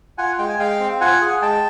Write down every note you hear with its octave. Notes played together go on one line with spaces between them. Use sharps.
F4 F#5 G#5
G#3 G5
G#5
G#3 F5 G5
C4
F4 F#5 G#5
G#4
G#3 G5 A5